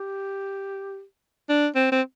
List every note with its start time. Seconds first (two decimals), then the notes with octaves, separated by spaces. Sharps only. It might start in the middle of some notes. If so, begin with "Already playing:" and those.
Already playing: G4
1.49 D4
1.75 C4
1.92 C4